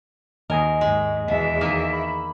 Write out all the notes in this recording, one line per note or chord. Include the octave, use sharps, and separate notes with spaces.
D#2 A#4 D#5 G#5 D#6
G#2 G#3
E2 B2 E5
D#3 A#3
B5